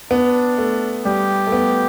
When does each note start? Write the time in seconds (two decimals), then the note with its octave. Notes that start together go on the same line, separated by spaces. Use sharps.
0.11 B3 D4
0.58 A3
1.05 G3 G4
1.47 A3
1.52 B3